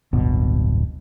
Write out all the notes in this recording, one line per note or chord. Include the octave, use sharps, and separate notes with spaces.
D1 G1 B2